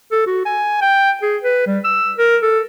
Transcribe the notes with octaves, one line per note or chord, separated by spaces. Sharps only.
A4
F#4
G#5
G5
G#4
B4
G3
E6
A#4
A4